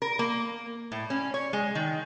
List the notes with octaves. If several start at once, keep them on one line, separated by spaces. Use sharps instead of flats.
A#4
A#3
A2
C#4
C#5
G#3
D#3